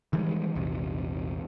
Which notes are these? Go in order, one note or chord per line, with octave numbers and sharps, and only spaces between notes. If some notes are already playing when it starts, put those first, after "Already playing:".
D#3 E3 G3 G#3
A#1 E2 C3